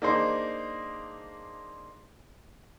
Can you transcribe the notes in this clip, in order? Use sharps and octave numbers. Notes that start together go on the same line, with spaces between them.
A#3 D4 D#4 G#4 C5